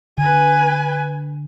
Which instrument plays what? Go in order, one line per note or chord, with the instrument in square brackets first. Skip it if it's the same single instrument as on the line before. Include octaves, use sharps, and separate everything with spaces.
[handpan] D3 [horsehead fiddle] B4 G#5